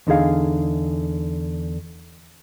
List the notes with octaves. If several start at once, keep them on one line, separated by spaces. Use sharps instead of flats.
E2 D3 D#4 G#4 F5